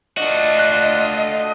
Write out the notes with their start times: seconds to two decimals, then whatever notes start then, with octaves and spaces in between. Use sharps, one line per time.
0.17 A3 D4 F4 F#4 D#5
0.59 F#6